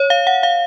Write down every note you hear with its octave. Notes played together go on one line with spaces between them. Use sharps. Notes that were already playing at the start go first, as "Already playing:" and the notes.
Already playing: C#5
F5
F#5
F5